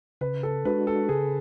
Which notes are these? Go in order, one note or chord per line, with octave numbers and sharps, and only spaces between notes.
C#3 B4
A4
G#3 D4 F#4 B4
A4
C#3 G#4